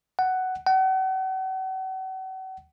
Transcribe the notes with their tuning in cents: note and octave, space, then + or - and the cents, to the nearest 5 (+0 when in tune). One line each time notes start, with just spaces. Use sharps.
F#5 +10
F#5 +40